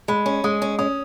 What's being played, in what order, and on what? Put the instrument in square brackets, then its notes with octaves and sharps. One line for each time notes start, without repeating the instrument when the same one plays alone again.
[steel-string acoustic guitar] G#3 [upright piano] B5
[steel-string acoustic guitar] C#4
[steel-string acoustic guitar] G#3 [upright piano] D#6
[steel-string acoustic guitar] C#4
[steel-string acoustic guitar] C#4 [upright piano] D#6